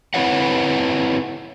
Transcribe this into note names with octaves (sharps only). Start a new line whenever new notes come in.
C4 E4 B4 C#5 F#5